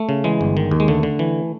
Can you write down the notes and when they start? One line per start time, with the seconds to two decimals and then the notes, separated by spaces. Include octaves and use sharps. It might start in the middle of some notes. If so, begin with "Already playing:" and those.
Already playing: A3
0.09 C#3
0.24 E3 G#3
0.41 G1
0.57 D#3
0.71 D#2
0.80 G#3
0.88 D3 A3
1.03 D3
1.19 E3